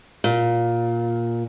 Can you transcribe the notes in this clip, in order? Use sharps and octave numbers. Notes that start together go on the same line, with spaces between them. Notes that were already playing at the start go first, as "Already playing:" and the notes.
A#2